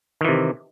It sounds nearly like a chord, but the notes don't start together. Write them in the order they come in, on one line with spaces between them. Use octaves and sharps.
D#3 E3 C3